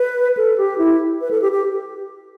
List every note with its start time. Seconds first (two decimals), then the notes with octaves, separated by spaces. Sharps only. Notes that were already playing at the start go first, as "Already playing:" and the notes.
Already playing: B4
0.37 A4
0.58 G4
0.78 E4
1.21 B4
1.31 A4
1.42 G4
1.52 G4